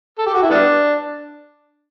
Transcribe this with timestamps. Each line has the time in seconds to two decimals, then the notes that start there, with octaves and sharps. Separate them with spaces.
0.18 A4
0.26 G4
0.34 F#4
0.42 E4
0.50 G3 B3 D4